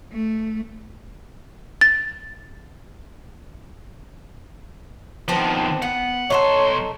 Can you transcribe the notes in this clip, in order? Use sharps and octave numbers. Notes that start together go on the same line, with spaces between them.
A3
A6
D#3 F3 B3 C4 D4
B3 F#5
B1 D#4 F#4 A4 C#5 C6